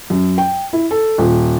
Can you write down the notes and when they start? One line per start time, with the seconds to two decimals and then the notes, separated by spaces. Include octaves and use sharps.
0.10 F#2
0.38 G5
0.73 E4
0.91 A4
1.18 D#1